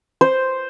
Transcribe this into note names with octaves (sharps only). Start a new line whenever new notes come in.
C5